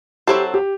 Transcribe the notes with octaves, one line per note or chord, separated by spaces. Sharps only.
F#3 C4 E4 G4 A4 C5
G4